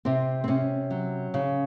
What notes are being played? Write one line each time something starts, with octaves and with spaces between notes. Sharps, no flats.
C3 C4
C4
C3 C#4
F#3
C#3